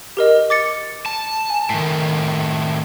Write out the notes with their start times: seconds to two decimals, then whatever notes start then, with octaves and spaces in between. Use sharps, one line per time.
0.17 G4 A#4 D#5
0.50 D6 A6 C#7
1.06 A5
1.50 G#5
1.70 A2 D#3